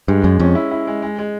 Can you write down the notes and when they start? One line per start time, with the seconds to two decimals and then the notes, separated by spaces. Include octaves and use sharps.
0.08 G2 G#3
0.23 F#2 G#3
0.39 F2 C#4
0.55 E4
0.71 E4
0.87 G#3
1.02 G#3
1.19 G#3